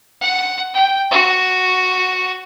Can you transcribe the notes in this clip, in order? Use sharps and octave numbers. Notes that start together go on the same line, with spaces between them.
F#5
G5
F#4